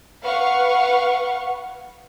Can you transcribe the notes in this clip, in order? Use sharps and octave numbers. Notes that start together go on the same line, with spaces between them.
B4 F5 F#5 C#6